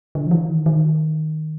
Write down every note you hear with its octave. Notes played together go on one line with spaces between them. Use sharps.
D3
F3
E3
D#3
D#3